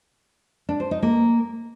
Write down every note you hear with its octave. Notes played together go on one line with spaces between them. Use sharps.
D4
C5
D#4
A#3